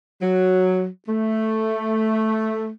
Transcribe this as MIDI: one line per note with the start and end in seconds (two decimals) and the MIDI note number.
0.21 0.86 54
1.07 2.68 57